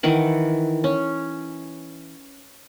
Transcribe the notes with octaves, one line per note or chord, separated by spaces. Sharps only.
D#3 E3 F#5
C#4